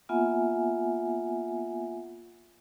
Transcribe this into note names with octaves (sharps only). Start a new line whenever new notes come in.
A#3 B3 F4 E5 F#5 G#5